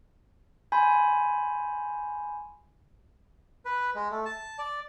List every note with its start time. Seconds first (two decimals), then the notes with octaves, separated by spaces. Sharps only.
0.72 G#5 B5 C6 G6
3.65 B4
3.95 G#3
4.11 A3
4.26 A5
4.59 D5